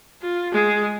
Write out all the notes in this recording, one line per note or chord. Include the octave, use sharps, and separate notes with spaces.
F4
G#3 G#4